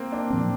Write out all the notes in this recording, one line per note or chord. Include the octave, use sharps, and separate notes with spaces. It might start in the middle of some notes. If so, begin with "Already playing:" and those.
Already playing: A#3 C4
D4
A#2 F3 C4